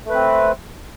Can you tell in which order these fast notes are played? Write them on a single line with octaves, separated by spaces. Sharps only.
A3 B4 C4